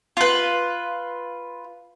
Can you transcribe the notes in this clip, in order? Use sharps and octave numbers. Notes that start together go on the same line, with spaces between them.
F4 B4